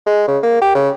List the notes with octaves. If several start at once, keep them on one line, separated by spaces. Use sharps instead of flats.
G#3
C#3
A#3
G4
C#3